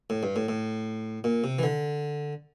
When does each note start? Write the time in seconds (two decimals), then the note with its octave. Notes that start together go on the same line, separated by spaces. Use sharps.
0.10 A2
0.23 G2
0.36 A2
0.49 A2
1.24 A#2
1.44 C3
1.59 E3
1.63 D3